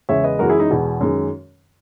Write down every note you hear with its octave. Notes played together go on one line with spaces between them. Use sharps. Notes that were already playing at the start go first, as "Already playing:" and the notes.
E2 C#3 G#3 C#5 E5
B4 D#5
F#2 E3 G#3 F#4 A#4
E4 G#4
D#4
E2 B2 G#3
F#2 D#3 G#3